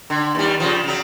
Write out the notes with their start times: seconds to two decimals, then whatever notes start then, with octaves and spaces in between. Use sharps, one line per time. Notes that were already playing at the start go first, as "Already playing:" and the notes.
0.10 D3
0.35 D#2 G3
0.60 C#3 F3
0.84 C#3 F#3